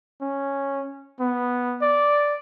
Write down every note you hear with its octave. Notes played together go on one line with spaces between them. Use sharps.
C#4
B3
D5